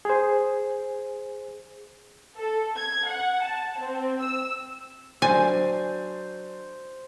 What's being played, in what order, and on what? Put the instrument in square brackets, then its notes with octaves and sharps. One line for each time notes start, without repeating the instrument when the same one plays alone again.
[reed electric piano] G#4 C5
[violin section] A4
G#6
F#5
A5
C4
E6
[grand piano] F#3 D4 A6 [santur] C5 [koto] G#5